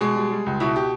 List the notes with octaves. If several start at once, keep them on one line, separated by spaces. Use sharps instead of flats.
B2 G#3 G#4
G3
G3
C#2
B2 E4
G4